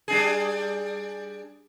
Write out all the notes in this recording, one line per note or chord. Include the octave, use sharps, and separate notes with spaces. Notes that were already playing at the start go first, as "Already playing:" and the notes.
G3 D4 G#4